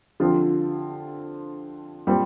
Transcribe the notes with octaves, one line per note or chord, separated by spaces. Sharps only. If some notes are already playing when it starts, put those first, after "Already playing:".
D3 F3 C4 F4
A#2 G3 C4 G4